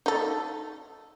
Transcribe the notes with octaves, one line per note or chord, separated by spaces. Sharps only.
D#4 A4